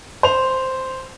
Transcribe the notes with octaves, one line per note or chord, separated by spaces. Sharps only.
C5 F7